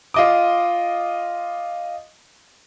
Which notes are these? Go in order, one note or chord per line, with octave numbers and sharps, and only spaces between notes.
F4 D#5 D6